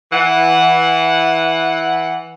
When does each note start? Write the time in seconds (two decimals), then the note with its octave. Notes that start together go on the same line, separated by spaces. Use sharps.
0.13 E3 F#5